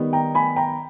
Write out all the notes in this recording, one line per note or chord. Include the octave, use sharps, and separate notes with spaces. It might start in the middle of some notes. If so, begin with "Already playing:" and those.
Already playing: D#3 G3 B3
G5 A#5
G#5 B5
G5 A#5